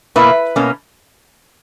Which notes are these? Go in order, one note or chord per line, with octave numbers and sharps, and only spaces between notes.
B2 A#3 E4 B4
B2 A#3 C#4